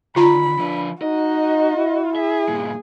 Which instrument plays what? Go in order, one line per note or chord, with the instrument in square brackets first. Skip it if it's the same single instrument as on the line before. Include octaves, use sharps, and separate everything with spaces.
[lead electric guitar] D3 D#3 [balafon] F4 A#5 [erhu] B5
[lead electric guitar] F3 B4 [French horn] D4
[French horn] D#4 [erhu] F#4 [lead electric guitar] D#5
[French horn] E4
[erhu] G#4 [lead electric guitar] E5
[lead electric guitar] G2 A#2